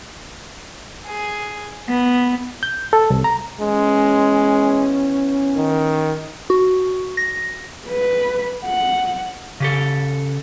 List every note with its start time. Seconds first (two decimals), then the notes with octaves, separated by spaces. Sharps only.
1.06 G#4
1.88 B3
2.63 G6
2.93 A4
3.10 C2
3.24 A#5
3.61 E3 G#3 B3 C#4
5.56 D#3
6.50 F#4
7.17 A#6
7.88 B4
8.65 F#5
9.60 C#3 G4 A4